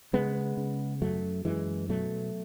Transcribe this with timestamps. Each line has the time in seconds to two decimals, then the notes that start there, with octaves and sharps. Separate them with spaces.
0.13 C#3 G#3 B3
0.57 C#3
1.02 F#2 F#3 A3
1.45 F#2 E3 G#3
1.89 B2 F#3 A3